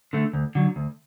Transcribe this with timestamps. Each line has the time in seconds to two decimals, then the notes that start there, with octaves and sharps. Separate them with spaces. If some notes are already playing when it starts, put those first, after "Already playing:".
0.13 D3 A3
0.33 D2
0.55 D3 F#3
0.76 D2